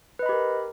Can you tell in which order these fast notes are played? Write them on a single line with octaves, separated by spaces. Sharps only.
B4 D#5 B5 G4 A#4